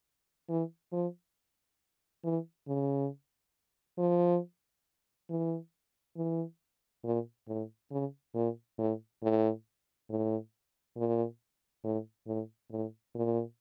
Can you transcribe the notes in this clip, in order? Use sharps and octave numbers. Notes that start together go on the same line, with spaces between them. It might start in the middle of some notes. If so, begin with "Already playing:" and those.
E3
F3
E3
C#3
F3
E3
E3
A#2
A2
C#3
A#2
A2
A2
A2
A#2
A2
A2
A2
A#2